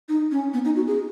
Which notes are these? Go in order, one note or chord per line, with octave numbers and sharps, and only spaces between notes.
D#4
C#4
B3
D#4
F#4
G#4